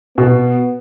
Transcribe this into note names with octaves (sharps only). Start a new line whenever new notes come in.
B2 B3